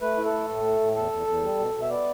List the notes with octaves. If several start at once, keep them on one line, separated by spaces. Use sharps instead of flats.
A3 B4
E4
A4
A3
A2
A3
A2
E2 A4
E2
E2
G3
B2
B2
E5
B3 D5